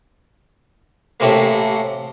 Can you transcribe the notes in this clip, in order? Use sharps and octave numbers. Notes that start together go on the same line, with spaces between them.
A1 A2 C3 A#3